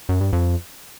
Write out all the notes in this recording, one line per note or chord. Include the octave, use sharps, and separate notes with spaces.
F#2
G2
F2